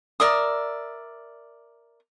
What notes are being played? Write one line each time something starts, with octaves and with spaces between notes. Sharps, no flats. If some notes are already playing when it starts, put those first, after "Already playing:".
A#4 D5 E5 D#6